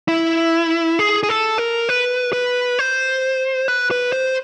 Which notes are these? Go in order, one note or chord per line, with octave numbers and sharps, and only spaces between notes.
E4
G#4
G#4
A4
A#4
B4
B4
C5
B4
B4
C5